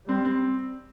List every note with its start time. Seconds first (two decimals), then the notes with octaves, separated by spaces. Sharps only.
0.08 G3 C4
0.25 C4